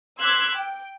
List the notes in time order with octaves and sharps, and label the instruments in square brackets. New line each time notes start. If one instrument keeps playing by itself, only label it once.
[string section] C6 D6 E6 F#6 G#6 B6
G5